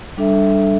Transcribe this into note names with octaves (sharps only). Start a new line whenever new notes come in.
G3 D4 A4 E5